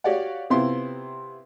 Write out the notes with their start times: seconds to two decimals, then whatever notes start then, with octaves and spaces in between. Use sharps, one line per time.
0.04 F#4 G4 C#5 D5 F5 F#5
0.50 C3 B3 C4 E4 F4 C6